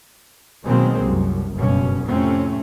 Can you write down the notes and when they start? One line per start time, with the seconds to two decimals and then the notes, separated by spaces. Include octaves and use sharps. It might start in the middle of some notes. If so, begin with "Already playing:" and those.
0.65 B2 D#3 F#3 G#3 A#3 C4
1.01 C2 F#2
1.54 F#1 G2 B2 C#4
2.06 F2 A2 C3 A3 C4 C#4